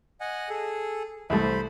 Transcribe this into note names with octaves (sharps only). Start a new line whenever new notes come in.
D#5 F#5 G#5
G#4 A4
C2 A3 C5 B5